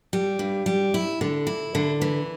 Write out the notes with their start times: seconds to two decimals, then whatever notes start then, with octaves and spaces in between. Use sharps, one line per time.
0.13 G3
0.39 G2
0.66 G3
0.94 E4
1.21 D3
1.47 E4
1.75 D3
2.01 E3